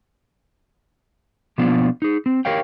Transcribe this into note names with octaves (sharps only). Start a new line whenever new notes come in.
B2 F3 A#3 B3 D4 F4
D#4 G#4
C4
G4 A#4 C#5 F5 G5